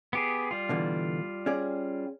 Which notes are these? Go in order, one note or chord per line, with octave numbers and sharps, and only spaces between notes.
B3 G4 G#4
G3 F4
B2 D3 E3
C#4 G#4 D5